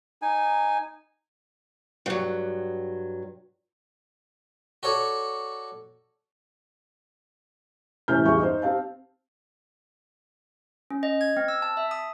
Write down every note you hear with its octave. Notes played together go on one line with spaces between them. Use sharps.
D#4 G#5
G2 F#3
F#4 A4 C#5 D5
A2 C3 E3 C#4 F6 G6
E2 G2 G4 G#4 E5 C#6
D#4 C5
C4 G4 F5 A5
C#4
D#5
G#6
C4
E6
A5
E5
D#6